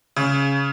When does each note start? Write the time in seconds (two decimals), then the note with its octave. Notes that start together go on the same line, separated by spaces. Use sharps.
0.16 C#3